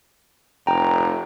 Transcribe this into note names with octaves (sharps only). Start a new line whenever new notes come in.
F1 G5 A#5